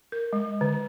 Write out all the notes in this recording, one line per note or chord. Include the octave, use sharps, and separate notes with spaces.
A#4
G#3
D3